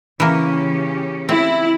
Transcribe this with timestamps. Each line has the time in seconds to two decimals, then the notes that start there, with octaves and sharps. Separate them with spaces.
0.20 C#3 E3 A#3 C#4 G4
1.29 C4 E4